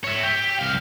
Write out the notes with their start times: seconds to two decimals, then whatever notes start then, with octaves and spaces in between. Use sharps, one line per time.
0.04 C#5 E5
0.23 G4
0.59 C2 F5